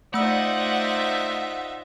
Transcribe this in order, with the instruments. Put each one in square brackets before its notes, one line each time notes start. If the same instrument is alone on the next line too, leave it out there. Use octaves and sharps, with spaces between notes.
[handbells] A3 E6 [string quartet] D#4 F4 E5 [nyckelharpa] C5 D5 [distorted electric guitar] F#5